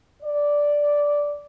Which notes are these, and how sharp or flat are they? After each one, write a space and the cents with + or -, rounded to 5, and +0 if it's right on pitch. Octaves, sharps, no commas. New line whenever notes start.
D5 -5